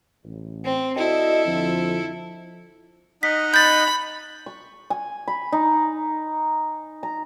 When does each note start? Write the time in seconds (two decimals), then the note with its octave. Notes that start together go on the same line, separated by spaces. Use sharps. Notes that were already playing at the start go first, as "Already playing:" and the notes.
0.25 A1
0.64 C4
0.97 E4 F#4 A4 D5 D#5
1.46 F2 D3 F3
3.23 D#4 D#5 F#5 B6
3.54 B5 G6 A6
4.46 C#6
4.90 G#5
5.28 B5
5.52 D#4
7.03 A#5